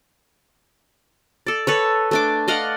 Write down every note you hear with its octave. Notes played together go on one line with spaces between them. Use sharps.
A4 D5
A4 B4 C#5
A3 D4 D6
D5 D#5 F5 F#5